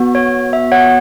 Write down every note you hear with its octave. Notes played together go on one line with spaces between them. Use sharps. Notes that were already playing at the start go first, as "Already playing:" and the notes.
Already playing: B3 F#4
C#5
E5
C#5 F#5